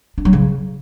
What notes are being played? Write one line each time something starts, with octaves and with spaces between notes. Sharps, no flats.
D4
F#3
C#3